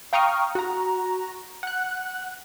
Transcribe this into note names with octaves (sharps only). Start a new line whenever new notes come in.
F5 G5 A#5 C#6 D#6 F6
F#4 A#5
F#5 F#6